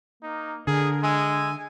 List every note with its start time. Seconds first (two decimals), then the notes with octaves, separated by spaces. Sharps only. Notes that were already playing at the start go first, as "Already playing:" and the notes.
0.23 A#3 D#4
0.67 D3 G#4 A#4
1.03 G#3 E5 G#5